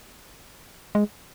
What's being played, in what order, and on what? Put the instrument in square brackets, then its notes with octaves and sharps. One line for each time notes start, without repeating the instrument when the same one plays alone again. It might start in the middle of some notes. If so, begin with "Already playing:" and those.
[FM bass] G#3